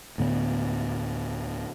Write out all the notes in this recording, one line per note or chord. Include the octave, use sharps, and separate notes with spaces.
D2 A2 D3 B3